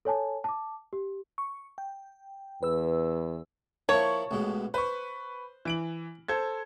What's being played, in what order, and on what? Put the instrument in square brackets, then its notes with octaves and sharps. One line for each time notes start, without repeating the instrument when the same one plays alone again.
[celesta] A4 C#5 G#5 A5
A5 D6
G4
[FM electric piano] C#6
G5
[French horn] E2 [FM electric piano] B4 E6
[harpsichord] F3 A#3 E4 [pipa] C#5 [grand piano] A5 C#6
[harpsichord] A1 B2 G#3
[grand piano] B4 C#6 [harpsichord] C5
[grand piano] E3 D7 F#7
A4 C5 G#6